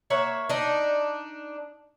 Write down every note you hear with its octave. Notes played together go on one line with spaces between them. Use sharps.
A#3 C#5 E5 F#5
D4 D#4